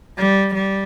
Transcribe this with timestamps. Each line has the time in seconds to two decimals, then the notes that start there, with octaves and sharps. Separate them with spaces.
0.18 G3
0.55 G3